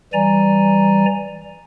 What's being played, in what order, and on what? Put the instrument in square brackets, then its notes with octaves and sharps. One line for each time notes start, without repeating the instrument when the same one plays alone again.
[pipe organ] E3 G3 D5 G#5 A#5